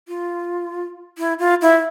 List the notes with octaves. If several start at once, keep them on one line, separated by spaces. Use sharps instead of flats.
F4
E4
F4
E4